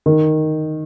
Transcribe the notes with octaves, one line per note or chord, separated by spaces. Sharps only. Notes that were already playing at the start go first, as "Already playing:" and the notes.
D#3